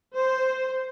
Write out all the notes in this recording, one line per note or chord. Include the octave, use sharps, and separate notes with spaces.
C5